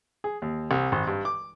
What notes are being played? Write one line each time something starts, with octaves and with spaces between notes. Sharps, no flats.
G#4
D#2
C2
G#1
G2
D6